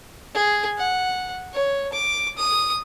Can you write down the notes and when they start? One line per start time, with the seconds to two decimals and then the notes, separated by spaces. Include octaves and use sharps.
0.35 G#4
0.78 F#5
1.53 C#5
1.93 D6
2.38 D#6